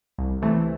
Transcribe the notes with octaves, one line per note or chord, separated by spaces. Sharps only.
C2
C3 E3 A3